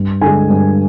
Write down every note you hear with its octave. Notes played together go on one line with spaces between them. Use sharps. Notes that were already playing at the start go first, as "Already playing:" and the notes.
Already playing: G2
D3 G#3 G#5
G2